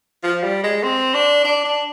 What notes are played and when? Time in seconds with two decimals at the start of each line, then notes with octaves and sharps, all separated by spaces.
0.23 F3
0.43 G3
0.64 G#3
0.84 C4
1.14 D4
1.44 D4
1.64 D4